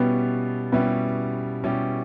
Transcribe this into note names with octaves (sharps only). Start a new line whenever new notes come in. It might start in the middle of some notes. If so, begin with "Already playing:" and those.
Already playing: B2 G3 B3 C#4 E4 G4
B2 G3 B3 C#4 E4 G4
B2 G3 C#4 E4 G4